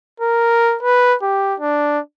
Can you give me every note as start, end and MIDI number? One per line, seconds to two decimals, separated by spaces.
0.20 0.78 70
0.83 1.15 71
1.22 1.55 67
1.60 1.99 62